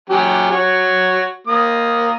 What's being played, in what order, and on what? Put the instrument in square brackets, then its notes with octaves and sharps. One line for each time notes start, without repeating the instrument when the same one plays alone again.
[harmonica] F#3 C#4 G4
F#4 C#5
A#3 D#6